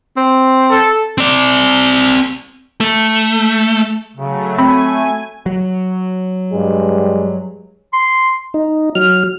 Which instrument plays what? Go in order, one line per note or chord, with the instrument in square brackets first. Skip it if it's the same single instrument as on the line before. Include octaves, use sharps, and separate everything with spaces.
[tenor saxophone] C4
[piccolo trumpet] A4
[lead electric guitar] C4 D5
A3
[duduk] C#3 [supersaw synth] F#3 A3
[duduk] A3 [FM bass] C4 [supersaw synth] G#5 [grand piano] B5
[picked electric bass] F#3
[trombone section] G2 [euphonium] G#3
[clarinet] C6
[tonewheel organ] D#4
F#3 F6